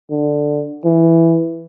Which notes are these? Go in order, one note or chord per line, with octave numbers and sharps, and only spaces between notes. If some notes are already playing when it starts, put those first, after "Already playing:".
D3
E3